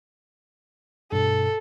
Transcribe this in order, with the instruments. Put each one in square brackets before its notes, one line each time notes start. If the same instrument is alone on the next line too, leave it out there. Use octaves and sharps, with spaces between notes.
[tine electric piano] G2 B2 [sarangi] A4